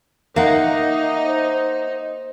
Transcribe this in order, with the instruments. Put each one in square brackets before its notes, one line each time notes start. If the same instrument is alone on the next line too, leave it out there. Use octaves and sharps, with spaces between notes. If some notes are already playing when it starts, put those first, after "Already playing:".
[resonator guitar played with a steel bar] A#3 [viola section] D#4 [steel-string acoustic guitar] E5 F#5
[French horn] C5